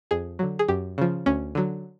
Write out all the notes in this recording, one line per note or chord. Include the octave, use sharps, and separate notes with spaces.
F2 G#4
D3 F#3
G#4
F#2 G4
C#3 F3
D2 C#4
D3 F#3